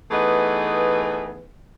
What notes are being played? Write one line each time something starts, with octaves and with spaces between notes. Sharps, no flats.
E3 A3 B3 D#4 G#4 B4